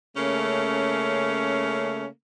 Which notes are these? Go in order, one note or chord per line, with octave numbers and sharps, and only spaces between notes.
C#3 A3 A#3 C#4